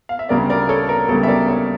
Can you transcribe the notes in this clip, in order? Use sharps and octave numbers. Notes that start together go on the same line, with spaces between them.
F5
E5
D2 C#3 G3 A#4 D5
A#4 D5
A4 C#5
A#4
D2 C#3 G3 A4 C#5
E5
A#4 D5
C#5 E5